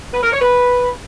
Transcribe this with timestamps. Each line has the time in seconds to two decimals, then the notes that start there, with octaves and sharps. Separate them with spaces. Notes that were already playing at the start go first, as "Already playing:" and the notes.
0.14 B4
0.23 A#4
0.32 C#5
0.42 B4